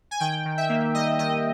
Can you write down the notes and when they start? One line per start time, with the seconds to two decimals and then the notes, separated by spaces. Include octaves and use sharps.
0.11 G#5
0.20 D#3 G5
0.45 D#3
0.58 E5
0.69 A#3
0.94 G3 D#5
1.19 D#3 D#5